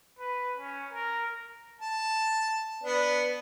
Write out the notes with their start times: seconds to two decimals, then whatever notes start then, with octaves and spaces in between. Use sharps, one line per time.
0.19 B4
0.56 C#4
0.93 A#4
1.81 A5
2.83 B3 D4